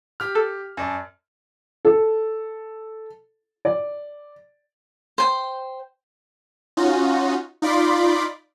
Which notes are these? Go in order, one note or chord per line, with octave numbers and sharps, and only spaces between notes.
G4 F6
A4
F#2 D5 A5
A4
D5
C5 G5
C#4 D#4 F4 F#4
D#4 F4 D5 B5 C6 D6